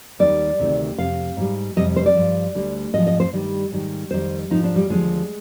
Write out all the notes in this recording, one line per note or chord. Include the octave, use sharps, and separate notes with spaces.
D#2 D#3 G3 D5
D2 C3 D#3
F2 C3 F5
G#2 G3
F2 C3 G3 D#5
C5
D5
G2 F3
D2 D3 G3
G#2 F3 D#5
D#5
C5
G2 D#3 G3
G#2 D#3 G3
F2 D#3 G3 C5
G#2 F3 D#4
D4
G3
D#2 D3 F3 G#3